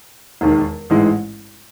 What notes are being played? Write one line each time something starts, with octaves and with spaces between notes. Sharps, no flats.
E1 D#2 D#3
A1 G#2 E3 G#3